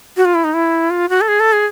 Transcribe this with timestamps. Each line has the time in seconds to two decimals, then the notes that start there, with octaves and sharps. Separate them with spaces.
0.17 F#4
0.25 F4
0.35 E4
0.44 D#4
0.54 E4
0.90 F4
1.09 F#4
1.21 A4
1.28 G#4
1.40 A4
1.53 G#4